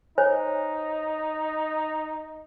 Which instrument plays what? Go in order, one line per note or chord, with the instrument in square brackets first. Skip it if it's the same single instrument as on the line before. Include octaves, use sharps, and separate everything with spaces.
[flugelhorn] D#4 [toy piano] C5 C#5 G#5